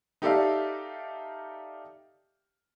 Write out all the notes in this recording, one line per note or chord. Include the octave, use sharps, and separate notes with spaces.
D#4 G4 A4 D5 E5 F5